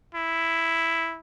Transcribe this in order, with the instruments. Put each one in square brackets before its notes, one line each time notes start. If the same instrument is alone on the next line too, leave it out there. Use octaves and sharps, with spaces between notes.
[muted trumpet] E4